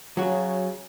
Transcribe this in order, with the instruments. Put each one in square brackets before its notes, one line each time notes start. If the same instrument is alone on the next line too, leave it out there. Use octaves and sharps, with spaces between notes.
[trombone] C#3 [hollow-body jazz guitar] F#3 F#4